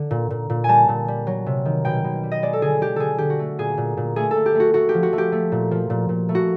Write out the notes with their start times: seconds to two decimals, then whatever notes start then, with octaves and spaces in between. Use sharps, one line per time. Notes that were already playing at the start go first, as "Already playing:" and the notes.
Already playing: D3
0.11 A#2
0.30 A#2
0.50 A#2
0.64 G3 G#5 A5
0.89 A#2
1.08 G3
1.27 F#3
1.46 C3
1.65 D#3
1.85 B2 G5
2.04 B2
2.23 G3
2.32 D#5
2.43 G#3 D5
2.53 A4
2.61 D3 G#4
2.81 G#3 G4
2.96 D3 G#4 A4
3.18 D3 G4
3.30 F#4
3.39 A3
3.58 A#2 G#4
3.78 A#2
3.97 A#2
4.16 A3 G#4
4.31 A3 A4
4.46 G4
4.55 A3
4.60 F#4
4.74 A3 F#4
4.89 G4
4.94 F3
5.03 F#4
5.13 A3
5.18 G4
5.32 A3
5.52 A#2
5.71 F3
5.90 A#2
6.09 A#2
6.29 A3
6.35 F#4